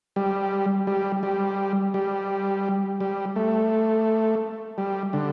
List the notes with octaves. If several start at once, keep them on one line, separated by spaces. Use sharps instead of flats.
G3
G3
G3
G3
G3
A3
G3
D3